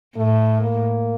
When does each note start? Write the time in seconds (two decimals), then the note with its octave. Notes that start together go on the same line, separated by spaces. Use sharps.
0.16 A2 A3
0.61 A#3